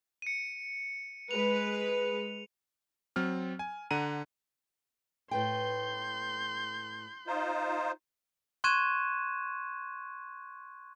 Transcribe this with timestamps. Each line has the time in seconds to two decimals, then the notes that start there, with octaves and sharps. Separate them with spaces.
0.22 C#7 D#7
1.31 G#3 B4 F7
3.16 F#3 C4 F6
3.59 G#5
3.91 D3 F#5 A#5 D#7
5.31 A2 B4 G5 C6 G6
7.27 D#4 F4 C5
8.64 C6 C#6 F#6 G#6 D#7 E7